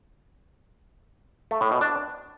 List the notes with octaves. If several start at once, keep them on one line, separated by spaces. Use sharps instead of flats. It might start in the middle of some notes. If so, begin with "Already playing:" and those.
A3
A2
B2
D4